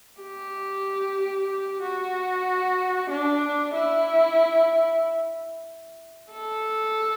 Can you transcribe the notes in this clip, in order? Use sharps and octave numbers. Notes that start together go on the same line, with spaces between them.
G4
F#4
D4
E4
A4